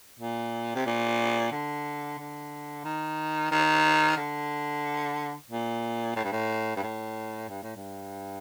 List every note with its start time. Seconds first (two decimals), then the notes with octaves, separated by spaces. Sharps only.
0.19 A#2
0.75 C3
0.86 A#2
1.52 D3
2.19 D3
2.85 D#3
3.51 D#3
4.17 D3
5.50 A#2
6.16 A2
6.24 G2
6.32 A2
6.76 G2
6.83 A2
7.49 G2
7.63 A2
7.76 G2